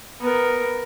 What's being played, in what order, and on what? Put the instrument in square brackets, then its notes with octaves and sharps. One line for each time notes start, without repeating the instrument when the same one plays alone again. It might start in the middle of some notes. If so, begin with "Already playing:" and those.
[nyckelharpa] B3 A#4